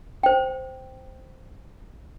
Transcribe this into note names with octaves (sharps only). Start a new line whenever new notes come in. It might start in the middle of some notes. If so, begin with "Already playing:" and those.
C5 G5